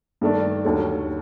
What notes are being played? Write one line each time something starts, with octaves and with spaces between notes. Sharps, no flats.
G2 D#3 A3 D4
D#2 D3 F#3 A3